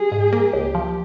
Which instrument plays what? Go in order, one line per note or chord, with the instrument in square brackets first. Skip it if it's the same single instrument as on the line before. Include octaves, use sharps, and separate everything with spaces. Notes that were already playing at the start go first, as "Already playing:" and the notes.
Already playing: [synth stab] G3 [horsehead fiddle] G#4
[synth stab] G#2
A#3
[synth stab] C#2 [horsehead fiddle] G4
[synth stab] F3